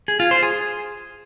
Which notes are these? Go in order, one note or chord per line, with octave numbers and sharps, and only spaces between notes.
G#4
F4
C5
G#4